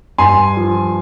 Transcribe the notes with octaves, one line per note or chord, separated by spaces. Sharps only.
G2 G#5 C6
F3